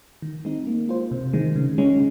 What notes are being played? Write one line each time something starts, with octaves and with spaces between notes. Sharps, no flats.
D#3
G#3 C4 D#4
A#3
F4 C5
C3
D#3 G#3
C#3
G#3 C#4